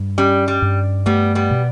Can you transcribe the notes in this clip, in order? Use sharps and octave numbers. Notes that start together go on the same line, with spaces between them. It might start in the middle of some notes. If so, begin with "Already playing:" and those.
Already playing: G2
G3 C#4
G3
G2
G3 A3 B3
G3 B3
B2